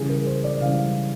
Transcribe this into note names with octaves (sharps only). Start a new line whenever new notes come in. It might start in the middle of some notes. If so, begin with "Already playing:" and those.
Already playing: C#3 E3 G3 G#4
A#4
C5
D5
C#3 E3 G3 F5